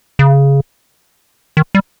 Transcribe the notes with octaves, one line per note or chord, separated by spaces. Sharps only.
C#3
D#3
G3